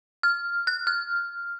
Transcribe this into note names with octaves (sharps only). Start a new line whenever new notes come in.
F6
F#6
F6